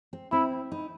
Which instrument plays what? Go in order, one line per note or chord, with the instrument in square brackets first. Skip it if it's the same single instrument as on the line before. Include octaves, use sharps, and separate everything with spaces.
[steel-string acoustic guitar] C4
[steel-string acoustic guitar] C4 [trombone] E4
[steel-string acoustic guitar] D#4